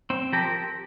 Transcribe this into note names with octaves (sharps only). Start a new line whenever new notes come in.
C4
F3 G4 A#4